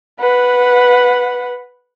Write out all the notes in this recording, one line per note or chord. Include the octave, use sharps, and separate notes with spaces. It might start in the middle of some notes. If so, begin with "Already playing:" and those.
B4 F#5